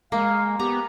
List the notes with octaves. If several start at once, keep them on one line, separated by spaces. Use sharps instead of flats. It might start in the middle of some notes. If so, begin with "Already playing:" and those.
G#3 A#3 F5
B3 G4 A#5